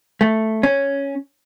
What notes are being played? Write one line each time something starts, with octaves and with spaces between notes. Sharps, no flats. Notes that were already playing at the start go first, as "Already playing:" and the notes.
A3
C#4